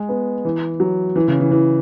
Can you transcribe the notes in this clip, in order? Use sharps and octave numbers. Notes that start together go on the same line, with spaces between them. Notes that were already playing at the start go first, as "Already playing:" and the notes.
Already playing: G#3
B3
E3
F#3
E3
C#3
E3
E3